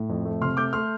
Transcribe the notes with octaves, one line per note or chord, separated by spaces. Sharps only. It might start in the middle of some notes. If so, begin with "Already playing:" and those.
Already playing: A2
F2
A3
C3 C6 F6
A3 D6 G6
A3 C6 F6